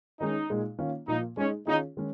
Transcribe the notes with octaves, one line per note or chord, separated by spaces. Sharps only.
D#3 G#3 C#4 D#4 G#4
A#2 G#3 D#4 G#4
D#3 A#3 C#4 F4
A#2 F3 A#3 D#4
G#3 C#4 D#4 G#4
D#3 C#4 D#4 F4 G#4
D#3 G#3 C#4